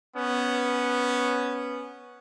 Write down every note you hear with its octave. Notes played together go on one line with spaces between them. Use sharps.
B3 C#4